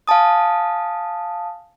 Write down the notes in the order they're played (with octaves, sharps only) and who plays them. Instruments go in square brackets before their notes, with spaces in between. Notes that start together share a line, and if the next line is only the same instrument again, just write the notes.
[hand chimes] F5 G#5 A5 D#6